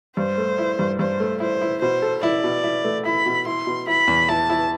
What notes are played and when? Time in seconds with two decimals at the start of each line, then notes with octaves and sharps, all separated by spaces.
0.17 G2 C5
0.38 A3
0.58 E4
0.79 G2
0.99 G2 C5
1.20 A3
1.40 E4 C5
1.61 E4
1.81 B2 C5
2.02 A4
2.23 E4 D5
2.44 B2
2.64 E4
2.84 A3
3.05 E4 B5
3.26 B2
3.46 E4 C6
3.67 B2
3.87 E4 B5
4.08 E2
4.28 E4 A5
4.50 E4